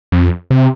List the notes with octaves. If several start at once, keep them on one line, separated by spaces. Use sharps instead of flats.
F2
C3